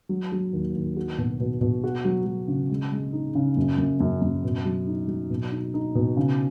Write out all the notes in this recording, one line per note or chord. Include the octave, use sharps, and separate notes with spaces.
F#3
F#3
D#2
D#2
F#4
B2
B2
B2
F#4
F#3
F#3
C#3
G#3
G#3
D#4
C#3
F#2
F#2
F#2
F#2
B2
F#3
D#4
F#3
B2
D#4
D#4
B2
C#3